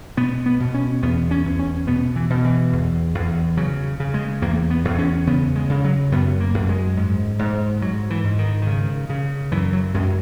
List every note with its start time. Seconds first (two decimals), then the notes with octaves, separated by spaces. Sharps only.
0.17 B2 B3
0.46 B3
0.60 B2
0.74 C#4
1.02 E2 B3
1.31 C#4
1.45 E2
1.59 C#4
1.87 B2 B3
2.16 E3
2.30 B2
2.44 E3
2.73 E2
3.15 E2
3.57 C#3 F#3
4.00 C#3
4.14 G#3
4.42 E2 A#3
4.70 B3
4.85 E2
4.99 C#4
5.27 C#3 B3
5.56 G#3
5.70 C#3
5.84 F#3
6.12 F#2 B3
6.40 A#3
6.54 F#2
6.69 G#3
6.97 G#2
7.39 G#2
7.81 G#2 F#3
8.10 E3
8.24 G#2
8.39 D#3
8.62 D#3
8.67 C#3
9.10 C#3
9.52 F#2 E3
9.73 F#3
9.94 F#2 G#3